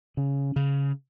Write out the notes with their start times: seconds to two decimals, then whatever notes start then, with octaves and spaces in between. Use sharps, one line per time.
0.17 C#3
0.56 C#3